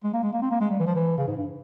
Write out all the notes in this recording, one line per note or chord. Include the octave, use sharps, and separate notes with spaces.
G#3
A#3
G#3
A#3
C4
A#3
G#3
G3
E3
F3
E3
C#3
G#2
G2